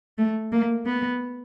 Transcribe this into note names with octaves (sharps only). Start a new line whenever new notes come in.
A3
A#3
B3